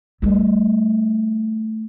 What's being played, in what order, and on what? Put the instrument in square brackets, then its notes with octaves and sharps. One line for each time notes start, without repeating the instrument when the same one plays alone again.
[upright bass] G3 A3